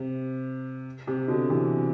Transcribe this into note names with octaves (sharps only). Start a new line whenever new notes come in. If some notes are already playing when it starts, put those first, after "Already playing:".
Already playing: C3
C3
B2 D3
C3 E3